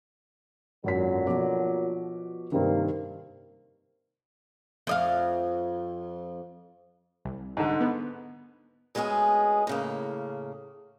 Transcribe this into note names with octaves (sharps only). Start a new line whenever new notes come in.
G#1 F#2 A#2 D3 F#3 B6
B2 F3 D6
G2 C3 D#3 A#3 C4
F2 D#5 F5
C2
G#2 D3
B3
D2 G#3 B3 C#4 G#4
A2 C#3 A#3